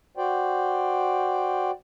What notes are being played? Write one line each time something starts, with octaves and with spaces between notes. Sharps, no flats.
F#4 C5 D5 G5